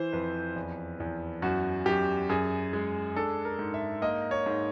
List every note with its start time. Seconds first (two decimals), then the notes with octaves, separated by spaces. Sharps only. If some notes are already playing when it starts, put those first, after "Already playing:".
Already playing: E3 C5
0.13 F2 B4
0.56 E2
1.00 E2
1.42 F#2 F#4
1.86 F#2 G4
2.29 F#2 G#4
2.73 G#3
3.16 D4 A4
3.45 A#4
3.59 G#2
3.74 E5
4.02 A#3 D#5
4.31 C#5
4.46 G#2